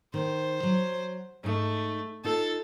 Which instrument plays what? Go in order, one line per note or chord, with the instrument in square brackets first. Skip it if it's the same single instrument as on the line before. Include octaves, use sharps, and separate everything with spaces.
[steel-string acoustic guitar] D#3 [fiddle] C5
[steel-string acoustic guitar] F#3
[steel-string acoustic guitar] G#2 D#4 [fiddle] A3
[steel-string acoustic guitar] D#4 F4 [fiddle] A4